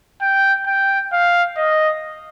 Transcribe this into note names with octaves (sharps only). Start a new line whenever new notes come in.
G5
G5
F5
D#5